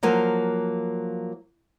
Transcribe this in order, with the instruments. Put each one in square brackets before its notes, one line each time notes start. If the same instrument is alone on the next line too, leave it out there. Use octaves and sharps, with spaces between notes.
[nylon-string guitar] F3 F#3 A#3